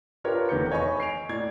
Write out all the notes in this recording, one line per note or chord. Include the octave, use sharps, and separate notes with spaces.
D4 F4 G4 A#4 B4 C#5
F1 E2 D#3 B4 G6 C#7
C#5 D#5 G#5 B5 C#6
C7 D7 F7
A2 D5 G#6